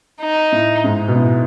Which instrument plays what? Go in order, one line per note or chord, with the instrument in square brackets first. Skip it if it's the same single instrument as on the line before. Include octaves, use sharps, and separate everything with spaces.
[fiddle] D#4
[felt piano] A2
G#2
B2
A2